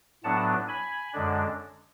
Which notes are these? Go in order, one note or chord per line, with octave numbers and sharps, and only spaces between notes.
A2 F#3 B3 D4 F#5 A5
G#5 B5
F#2 D3 G#3 D4